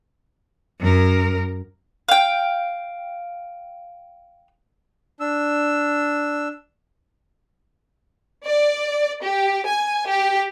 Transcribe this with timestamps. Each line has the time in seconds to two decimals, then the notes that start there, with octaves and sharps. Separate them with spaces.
0.80 F#2 A#4
2.09 F5 G5
5.20 D4 E6
8.45 D5
9.24 G4
9.67 G#5
10.09 G4